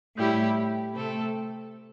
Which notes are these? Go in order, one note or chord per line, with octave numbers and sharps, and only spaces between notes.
A2 G3 E4 G4
C3 A3 C4 A4